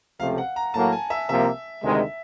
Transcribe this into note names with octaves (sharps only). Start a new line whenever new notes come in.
C#2 C3 F3 A3 F5
F#5
A#5
A2 F#3 A#3 A5
G#5
E5
C2 C3 F3 A#3 E5
D2 C3 D#3 G#3